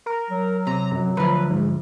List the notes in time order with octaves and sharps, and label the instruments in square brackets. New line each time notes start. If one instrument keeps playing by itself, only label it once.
[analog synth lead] A#4
[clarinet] F#3
[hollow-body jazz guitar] C3 [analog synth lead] A#5
[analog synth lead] F#2
[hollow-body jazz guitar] D2 F3 [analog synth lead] B4
[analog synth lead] G#2